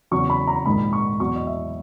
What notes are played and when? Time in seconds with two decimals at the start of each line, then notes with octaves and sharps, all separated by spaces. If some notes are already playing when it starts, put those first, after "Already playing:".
0.11 E2 C#3 F#3 C#6
0.30 B5
0.47 A#5
0.66 A#1 G#2 D#3 G#3 B5
0.93 C#6
1.20 E2 B2 F#3 C#6
1.36 D#5
1.47 E5